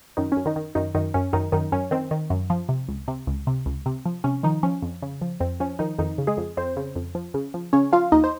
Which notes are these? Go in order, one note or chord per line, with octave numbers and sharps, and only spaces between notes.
F#2 D#3 D#4
C#4
F#2
D#3 D#4
D#3
F#2 D#3 D#4
F#2 D#3 D#4
F#2 C#4
F#2 D#3 D#4
F#2 D#3 D#4
F#2 C#4
D#3 C4
D#3
F#2
F3
C3
C#2
C3
C#2
C3
C#2
C3
F3
C3 C#4
D#3 F3 D#4
F3 C#4
F2
C#3
F3
F2 C4
F3 C#4
D#3 F3 D#4
F2 D#3 D#4
C#3
G#3 G#4
F2
F2 C4 C5
C#3
F2
F3
C#3
F3
C#3 C#4 C#5
F3 F4 F5
D#2 D#4 D#5
C5